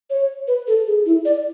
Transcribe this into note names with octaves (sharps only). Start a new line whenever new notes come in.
C#5
B4
A4
G#4
E4
D5